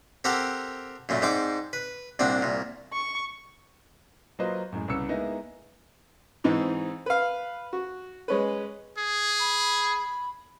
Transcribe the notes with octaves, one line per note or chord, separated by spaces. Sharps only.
C4 G4 A4 A#4 F#5 C6
F#2 A#2 A3
G#2 C4 D5 D6
B4
C2 A#2 C4 D4 F#5
C2 A#2
C#6
F#3 A#3 F4 B4 C5 D#5
F#2 A2 G#3
C2 C#3 B3 C#4 E6 C#7
G#3 A#3 B3 D#4 E4
G#2 E3 C4 D#4
B4 F5
F#4
G#3 C#4 B4
G#4
B5